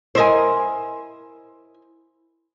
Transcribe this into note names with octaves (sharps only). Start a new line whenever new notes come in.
E4 A#4 C5 D#5 G#5